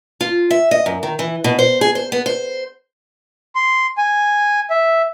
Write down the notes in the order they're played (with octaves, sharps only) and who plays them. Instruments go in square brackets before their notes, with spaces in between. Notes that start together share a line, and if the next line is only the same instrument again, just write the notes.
[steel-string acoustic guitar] F4
E5
D#5
F#2
D#3
E3
B2
C5
G#4
C5
B3
C5
[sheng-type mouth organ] C6
G#5
E5